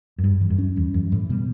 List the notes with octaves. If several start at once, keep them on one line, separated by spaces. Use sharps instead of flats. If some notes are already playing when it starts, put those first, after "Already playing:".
F#2
G2 G3
E3
F#2
C#4
E2 G3
F#2 E3
A2 E3
B2 G3